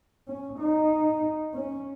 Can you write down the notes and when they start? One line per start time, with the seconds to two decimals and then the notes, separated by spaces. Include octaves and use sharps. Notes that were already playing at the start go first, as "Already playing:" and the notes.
0.28 C#4
0.59 D#4
1.54 C#4